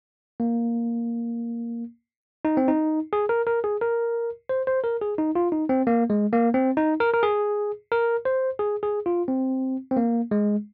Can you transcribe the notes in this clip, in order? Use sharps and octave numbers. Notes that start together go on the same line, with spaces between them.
A#3
D#4
C4
D#4
G#4
A#4
A#4
G#4
A#4
C5
C5
A#4
G#4
D#4
F4
D#4
C4
A#3
G#3
A#3
C4
D#4
A#4
A#4
G#4
A#4
C5
G#4
G#4
F4
C4
C4
A#3
G#3